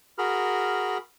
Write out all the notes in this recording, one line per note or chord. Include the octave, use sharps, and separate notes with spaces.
F#4 G#4 A#4 B5 F6